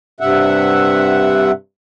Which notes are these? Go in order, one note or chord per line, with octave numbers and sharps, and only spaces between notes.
G2 C3 E5 F#5